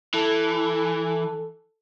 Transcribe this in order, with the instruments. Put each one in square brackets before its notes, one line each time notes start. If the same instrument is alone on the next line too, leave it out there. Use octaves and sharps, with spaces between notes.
[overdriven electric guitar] E3 [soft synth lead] A4